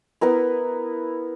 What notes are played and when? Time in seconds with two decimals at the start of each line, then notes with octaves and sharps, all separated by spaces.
0.21 B3 E4 A#4